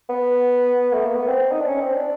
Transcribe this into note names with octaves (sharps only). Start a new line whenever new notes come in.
B3
A3
A#3
B3
C4
D#4
D4
C#4
C4
D4